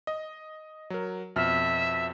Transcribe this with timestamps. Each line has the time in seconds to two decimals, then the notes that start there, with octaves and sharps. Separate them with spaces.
0.07 D#5
0.90 F#3 A#4
1.36 F2 B2 E5 F6